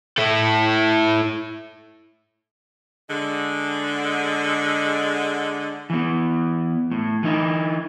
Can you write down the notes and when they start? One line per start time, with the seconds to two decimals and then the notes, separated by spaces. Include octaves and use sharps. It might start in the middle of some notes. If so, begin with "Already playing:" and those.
0.18 E4 A4
3.10 D3 G#3
5.90 E3 B3
6.91 A2
7.23 E3 D#4 E4